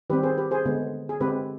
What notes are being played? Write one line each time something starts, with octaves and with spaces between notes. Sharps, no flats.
D#3 G3 C4 G4 B4
G#4 C5
G4 B4
G#4 C5
D3 G#3 B3
G#4
D3 G#3 C4 G4 B4